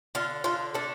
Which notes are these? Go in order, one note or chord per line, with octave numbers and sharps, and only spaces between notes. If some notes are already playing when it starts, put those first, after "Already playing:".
D3 F4
D3 F4
A3 D4